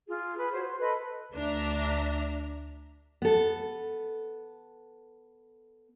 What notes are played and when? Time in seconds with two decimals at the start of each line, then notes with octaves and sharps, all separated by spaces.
0.08 F4 G#4
0.37 G#4 B4
0.51 F#4 C5 C#5
0.64 C6
0.79 A4 B4 D#5
1.34 D2 D4 E5 A#5
3.22 B3 A4